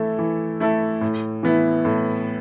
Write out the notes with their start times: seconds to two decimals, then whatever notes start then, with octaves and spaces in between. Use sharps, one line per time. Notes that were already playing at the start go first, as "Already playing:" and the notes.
Already playing: E3 A3 E4 A4
0.19 E3
0.60 A3 E4 A4
1.01 A2
1.43 E3 B3 E4
1.85 A2